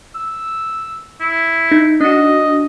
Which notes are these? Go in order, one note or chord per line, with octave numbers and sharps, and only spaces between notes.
E6
E4
D#4
D4 F#4 D#5